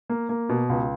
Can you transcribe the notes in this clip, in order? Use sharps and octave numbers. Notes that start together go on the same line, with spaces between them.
A#3
A#3
B2
C#2